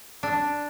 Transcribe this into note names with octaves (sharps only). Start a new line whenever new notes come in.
D4